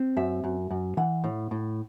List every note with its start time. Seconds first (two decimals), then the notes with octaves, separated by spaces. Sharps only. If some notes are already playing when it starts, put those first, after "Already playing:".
Already playing: C4
0.17 F#2 E5
0.44 F#2
0.70 F#2
0.97 E3 F#5
1.24 A2
1.51 A2